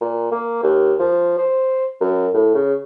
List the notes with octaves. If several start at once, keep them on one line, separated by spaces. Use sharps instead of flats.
A#2
A#3
D#2
F3
C5
F#2
A2
C#3